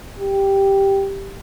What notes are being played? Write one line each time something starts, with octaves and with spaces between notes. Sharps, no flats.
G4